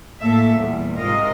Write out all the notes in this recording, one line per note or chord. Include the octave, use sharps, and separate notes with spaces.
A2 A#3 A4 E5
E2 A#2 G3
G#2 C3 F4 A#4 D#5